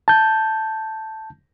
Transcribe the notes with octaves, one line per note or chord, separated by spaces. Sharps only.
A5 G6